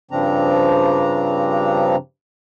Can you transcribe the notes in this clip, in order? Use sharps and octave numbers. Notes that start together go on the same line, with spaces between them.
G2 C#3 F3 C4 D4 A#5